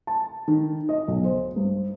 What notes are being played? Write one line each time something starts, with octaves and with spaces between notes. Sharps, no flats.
A5
D#3
D#5
B1
C5
G2